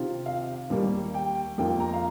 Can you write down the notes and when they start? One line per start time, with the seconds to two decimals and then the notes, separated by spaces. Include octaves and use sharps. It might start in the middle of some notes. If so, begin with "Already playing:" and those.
Already playing: C3 D#3 C4 F4
0.26 F5
0.70 D#2 D#3 G3 A#3
1.14 G5
1.58 F2 D#3 A#3 F4 G5
1.80 A#5
1.94 F5